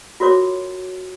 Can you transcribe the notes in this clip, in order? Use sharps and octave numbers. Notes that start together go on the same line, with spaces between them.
F4 F#4 A#4 C#5 D6